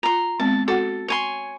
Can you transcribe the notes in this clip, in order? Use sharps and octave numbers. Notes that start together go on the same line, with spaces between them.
F4 A#5 C6
G#3 B3 C4 A5
F#4 A4 F#5
C#5 G#5 C6